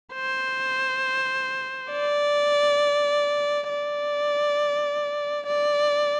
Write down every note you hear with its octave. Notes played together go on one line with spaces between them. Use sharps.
C5
D5
D5
D5